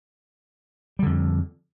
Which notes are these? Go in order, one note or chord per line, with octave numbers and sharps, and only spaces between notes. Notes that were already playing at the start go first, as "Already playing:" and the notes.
F2 D3 G3